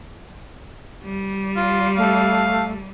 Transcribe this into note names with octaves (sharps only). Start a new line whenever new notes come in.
G3
F4
A3 F5